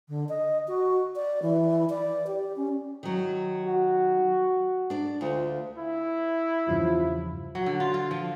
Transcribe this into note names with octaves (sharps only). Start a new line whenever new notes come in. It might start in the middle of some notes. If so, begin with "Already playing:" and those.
D3
D#5
F#4
D5
E3
D5
G4
C#4
D#3 F#3
F#4
D4 D5
D2 F4
E4
E2 G2 C#3 F3
F#3
D3
F4
F4
F3